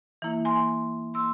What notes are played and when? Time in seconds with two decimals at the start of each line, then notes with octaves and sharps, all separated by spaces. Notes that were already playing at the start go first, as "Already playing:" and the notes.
0.22 E3 A#3 E4
0.45 G#5 C6
1.14 E3 A#3 C6 E6